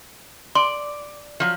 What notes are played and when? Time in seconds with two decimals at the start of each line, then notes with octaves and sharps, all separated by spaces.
0.55 D5 C6
1.40 F3 F#3